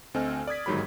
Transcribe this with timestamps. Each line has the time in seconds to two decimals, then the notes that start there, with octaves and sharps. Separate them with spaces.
0.14 D2 C4 A4 D#5 G#5 F6
0.47 D5 D#6 G#6 B6
0.66 G1 G#2 D#3 F#3 G4 B5